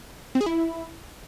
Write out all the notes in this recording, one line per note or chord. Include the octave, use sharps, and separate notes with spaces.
C4
G#4
E4